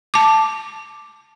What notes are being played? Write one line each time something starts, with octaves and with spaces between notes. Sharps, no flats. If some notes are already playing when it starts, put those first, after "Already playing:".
A5 D6